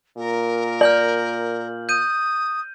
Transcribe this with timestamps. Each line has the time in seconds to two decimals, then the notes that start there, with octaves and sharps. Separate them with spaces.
0.17 A#2 A#4
0.81 D5 F6 G6 F#7
1.89 D#6 G6 D#7